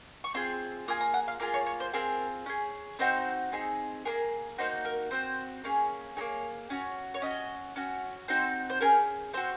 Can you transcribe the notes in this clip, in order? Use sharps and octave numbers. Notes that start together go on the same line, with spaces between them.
C#6
C4 F4 G#4 C6
A#3 F4 G#4 D#6
A#5
F#5
F5
A#3 F4 G#4 A#4
C#5
C#5
C5
C4 F4 G#4 A#4
C#4 G#4
C4 D#4 F#4 C5
C4 D#4 G#4
A#3 C#4 G#4 A#4
A#3 D#4 F#4 C5
A#4
C4 F#4 C5
A#3 C#4 G#4
A#3 D#4 G#4 C#5
C#4 F#4
C#5
C#4 F#4 D#5
C#4 F#4
C4 D#4 F#4 C5
C5
C#4 G#4 A#4
C4 F#4 C5